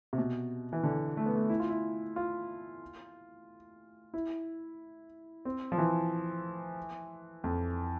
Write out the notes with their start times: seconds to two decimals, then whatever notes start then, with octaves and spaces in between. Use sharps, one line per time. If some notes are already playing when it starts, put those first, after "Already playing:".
0.13 C3
0.18 B2
0.73 E3
0.83 D3
1.17 A3
1.26 B3
1.35 A3
1.50 E4
1.60 F4
1.69 E4
2.16 F4
4.14 E4
5.45 C4
5.72 F3
5.78 E3
7.44 F2